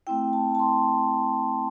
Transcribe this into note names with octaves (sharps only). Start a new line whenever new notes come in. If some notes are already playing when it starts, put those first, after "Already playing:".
A3 C4 E4 G5
A5
A5
C6